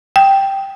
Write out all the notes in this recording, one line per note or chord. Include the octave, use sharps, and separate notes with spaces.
G5